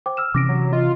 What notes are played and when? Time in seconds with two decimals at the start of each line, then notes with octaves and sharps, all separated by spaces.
0.06 C5 G5 D6
0.17 E6 F6 E7
0.34 C3 E3 C#4 D6 A#6 D7
0.49 F#3
0.73 F4 D#5